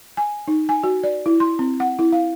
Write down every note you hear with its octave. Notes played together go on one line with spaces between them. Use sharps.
G#5
D#4
G#5
F#4
D5
E4
C6
C4
F#5
E4
F5